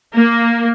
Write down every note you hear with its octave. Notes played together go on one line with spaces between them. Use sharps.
A#3